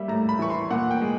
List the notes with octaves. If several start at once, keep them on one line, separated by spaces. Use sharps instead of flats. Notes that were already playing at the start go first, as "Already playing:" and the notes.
Already playing: G3 A#3 E5
A2 A#5
B5
E3 C#6
C6
A#2 F#5
G5
G#3